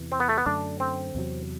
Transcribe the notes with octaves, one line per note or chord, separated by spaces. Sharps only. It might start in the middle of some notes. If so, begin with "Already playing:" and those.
Already playing: E2 C3 E3
C4
B3
A3
B3
F#2 D3 A3 D4
C4
E2 C3 F#3